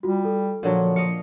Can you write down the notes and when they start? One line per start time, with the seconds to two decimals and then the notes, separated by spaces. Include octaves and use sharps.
0.03 G3 F4 F#4
0.25 A4
0.63 A#2 D3 F3 F#3
0.96 D#5 F5 C#7